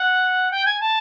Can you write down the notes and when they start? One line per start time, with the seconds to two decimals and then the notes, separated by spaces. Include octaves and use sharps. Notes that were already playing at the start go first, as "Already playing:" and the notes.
Already playing: F#5
0.51 G5
0.66 G#5
0.80 A5